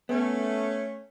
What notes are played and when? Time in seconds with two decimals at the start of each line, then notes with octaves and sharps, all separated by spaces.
0.09 A3 B3 C#4